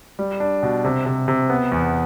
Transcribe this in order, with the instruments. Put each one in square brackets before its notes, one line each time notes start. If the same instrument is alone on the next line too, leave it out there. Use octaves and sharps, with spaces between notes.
[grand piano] G3
D4
B2
C3
C3
C3
B3
E2